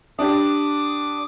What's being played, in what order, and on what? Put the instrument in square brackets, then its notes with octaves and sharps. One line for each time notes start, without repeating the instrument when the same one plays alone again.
[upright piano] D4 G4 [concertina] D6 D#6